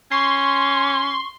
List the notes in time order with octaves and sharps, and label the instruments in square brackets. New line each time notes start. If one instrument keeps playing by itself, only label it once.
[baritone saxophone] C#4 [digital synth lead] C6 [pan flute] C#6